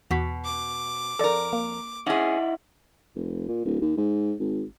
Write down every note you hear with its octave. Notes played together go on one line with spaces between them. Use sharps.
E2 B2 F#4 B6
D6
F2 A4 A#4 D5
A#3
C#4 D#4 E4 G#4 F#5
F1
A#2
D1
D#2
G#2
G#1